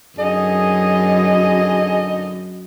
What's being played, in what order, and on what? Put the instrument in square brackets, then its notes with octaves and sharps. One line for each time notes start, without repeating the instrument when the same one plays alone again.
[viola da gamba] F#2 [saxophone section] D3 D#4 D#5 [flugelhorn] G#4